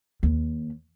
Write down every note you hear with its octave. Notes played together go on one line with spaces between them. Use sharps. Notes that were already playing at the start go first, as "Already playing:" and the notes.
D#2